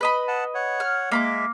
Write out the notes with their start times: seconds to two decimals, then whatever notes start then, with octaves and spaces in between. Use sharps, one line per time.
0.01 B4 D#5 B5
0.28 F#5 A5
0.55 C#5 F#5
0.80 F6
1.11 G#3 A#3 E5 B5 D6